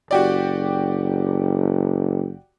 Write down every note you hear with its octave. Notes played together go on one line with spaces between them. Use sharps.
F#1 F#4 G4 D5